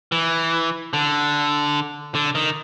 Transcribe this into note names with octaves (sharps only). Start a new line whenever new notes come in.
E3
D3
D3
D#3